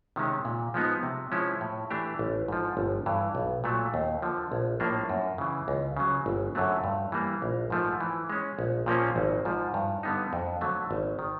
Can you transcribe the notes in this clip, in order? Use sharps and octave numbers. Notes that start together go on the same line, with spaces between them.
C3 D#3 G#3 C#4
A#2
F3 G#3 B3 D#4
C3
F3 G#3 C#4 E4
A2
E3 A3 D4 G4
A1
G#2 F3
G1
G2 E3
B1
A#2 F#3 A3
D#2
D3 F3
A#1
A2 F3 A#3 D4
F#2
C#3 E3
C#2
C#3 F#3
G1
F#2 D3 F#3 A3
G2
E3 G3 A#3
A#1
G#2 F3 A3
E3
G#3 C#4
A#1
A#2 F3 A#3 C#4
G#1
G#2 F3
G2
D3 G3 B3 D#4
F2
D3 F#3 A3
G#1
D#3